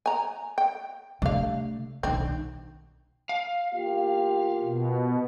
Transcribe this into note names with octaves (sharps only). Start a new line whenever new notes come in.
G#5 A#5
G5
C3 A3 D4 F5
B1 D#3 C4 D4
F5
E2 A#3 F4 G4
B2